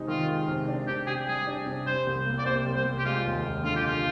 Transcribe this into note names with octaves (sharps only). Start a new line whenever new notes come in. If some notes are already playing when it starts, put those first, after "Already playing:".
Already playing: C3 G#3 D#4
D#3 F4
G#3
C3
D4
C3 G4
G4 G#4
G3 G#4
D4
C3
G3 C5
C2
A#3
D5
C3 C5
G3
C5
C2
G4
G#3 F4
D#2
D#2
D3 F4
G4
G#3 F4